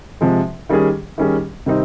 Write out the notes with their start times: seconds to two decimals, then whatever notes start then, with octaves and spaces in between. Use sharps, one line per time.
0.21 C3 F3 G#3
0.69 D#3 G3 C#4 G#4
1.18 D#3 G3 C#4 G#4
1.66 C3 D#3 G3 C4 D#4